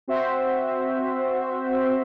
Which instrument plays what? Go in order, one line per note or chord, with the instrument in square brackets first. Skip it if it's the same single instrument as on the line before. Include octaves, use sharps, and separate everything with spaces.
[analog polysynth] C4 F#4 C5 E5